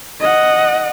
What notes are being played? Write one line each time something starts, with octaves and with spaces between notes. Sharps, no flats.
D#5 F#5